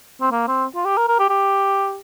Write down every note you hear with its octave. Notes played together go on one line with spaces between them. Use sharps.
C4
A#3
C4
F4
G4
A#4
A#4
G4
G4